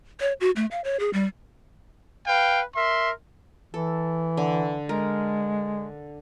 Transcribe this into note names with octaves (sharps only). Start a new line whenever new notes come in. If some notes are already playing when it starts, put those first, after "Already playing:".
C#5
F#4
A3
F5
C#5
G#4
G3
B4 F5 G5
A#4 E5 C6
E3 A4
D3
G#3 A#4